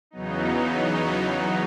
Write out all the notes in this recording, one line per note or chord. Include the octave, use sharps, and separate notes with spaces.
E2 C#3 F#3 B3 D#4